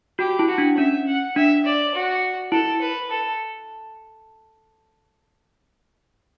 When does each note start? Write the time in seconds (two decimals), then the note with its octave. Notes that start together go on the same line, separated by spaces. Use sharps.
0.19 F#4 G4
0.39 E4
0.48 F#4
0.58 D4
0.77 C#4 E5
1.06 F#5
1.36 D4 E5
1.65 D5
1.94 F#4
2.52 E4 A4
2.81 B4
3.10 A4